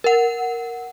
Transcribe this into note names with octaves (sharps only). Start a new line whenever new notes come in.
A#4 F#5